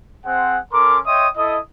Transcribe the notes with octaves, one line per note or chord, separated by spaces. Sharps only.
C4 G#4 C5 F#5
C#4 A4 A#4 C6 D6
C#5 D#5 E5 G5 C6 D#6
E4 A4 D#5 D#6